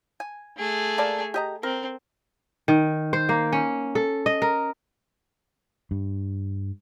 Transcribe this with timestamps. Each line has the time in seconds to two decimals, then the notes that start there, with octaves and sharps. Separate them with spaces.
0.20 G#5
0.58 A3 G#4
0.98 A#3 D5 A5
1.34 G4 D#5 A#5
1.63 C4 A#4
2.68 D#3
3.13 C5
3.29 A#3
3.53 C#4
3.95 A4
4.26 D#5
4.42 A#4
5.91 G2